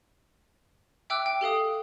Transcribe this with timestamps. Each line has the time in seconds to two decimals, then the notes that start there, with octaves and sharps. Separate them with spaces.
1.10 E5 G5 D6 E6 F#6
1.26 G5
1.41 G4 A4 F5 D#6